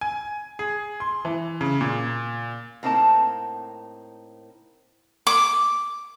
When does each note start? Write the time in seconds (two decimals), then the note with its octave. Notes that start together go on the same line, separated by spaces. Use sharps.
0.01 G#5
0.59 G#4
1.00 C6
1.25 E3
1.61 C#3
1.81 A#2
2.83 A2 A#3 C4 D#4 A5
5.27 D6